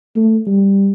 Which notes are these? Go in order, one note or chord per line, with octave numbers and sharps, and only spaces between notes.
A3
G3